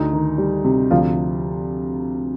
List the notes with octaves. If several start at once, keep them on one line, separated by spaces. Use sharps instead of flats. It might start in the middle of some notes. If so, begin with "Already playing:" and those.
Already playing: D2 D#4
D#3
G3
C3
D2 F3 F4